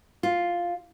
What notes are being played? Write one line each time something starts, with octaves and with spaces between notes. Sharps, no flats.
F4